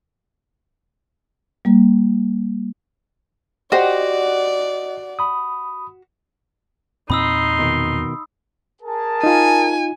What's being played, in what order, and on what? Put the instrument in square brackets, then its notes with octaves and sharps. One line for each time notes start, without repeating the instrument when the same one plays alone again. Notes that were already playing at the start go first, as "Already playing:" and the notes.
[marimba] G3 A#3
[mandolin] F#4 [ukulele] G4 C5 [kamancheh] D5 [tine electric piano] D#5 F#5
[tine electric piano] B5 D#6
[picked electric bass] E2 A#2 C4 [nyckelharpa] D#4 C6 [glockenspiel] B5 D#6 E6
[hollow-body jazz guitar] B2 D#3
[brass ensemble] G#4 A#4 A5
[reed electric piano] D#4 F4 [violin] G#5